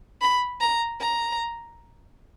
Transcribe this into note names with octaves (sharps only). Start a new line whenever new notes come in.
B5
A#5
A#5